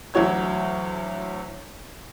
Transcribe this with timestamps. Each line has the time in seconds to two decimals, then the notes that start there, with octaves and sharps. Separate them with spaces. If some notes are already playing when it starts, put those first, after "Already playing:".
0.14 D2 E3 F#3 C#5 G#6